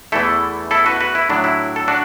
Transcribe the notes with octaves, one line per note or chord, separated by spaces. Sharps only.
E2 E3 A3 E4 A4
E4 A4
F#4 B4
F#4 B4
E4
A2 F#3 D4
E4
A4
D4 F#4